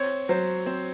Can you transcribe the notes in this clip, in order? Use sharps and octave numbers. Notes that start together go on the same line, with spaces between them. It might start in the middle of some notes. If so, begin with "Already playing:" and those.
Already playing: C4 C#5
F#3 C5
C4